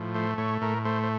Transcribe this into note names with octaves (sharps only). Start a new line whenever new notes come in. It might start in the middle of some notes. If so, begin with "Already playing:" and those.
Already playing: A2 F3
A3 C5
A2 C#5
A2 A#4
A3 C5
C5